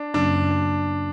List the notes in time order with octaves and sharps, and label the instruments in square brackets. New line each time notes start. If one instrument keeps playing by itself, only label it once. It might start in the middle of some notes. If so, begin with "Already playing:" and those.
Already playing: [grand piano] D4
[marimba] F#2 C#3 F#3 A#3 C#4 [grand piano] D4